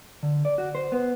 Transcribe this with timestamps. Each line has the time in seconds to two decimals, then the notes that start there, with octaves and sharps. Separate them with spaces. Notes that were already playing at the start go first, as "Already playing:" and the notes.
0.23 D3
0.45 D5
0.58 F#4
0.75 C5
0.92 B3